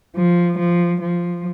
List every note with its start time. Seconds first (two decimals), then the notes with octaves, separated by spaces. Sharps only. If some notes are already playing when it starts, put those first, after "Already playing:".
0.14 F3
0.57 F3
1.00 F3